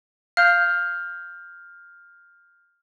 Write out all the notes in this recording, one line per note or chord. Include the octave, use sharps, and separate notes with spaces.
F5 F6 G6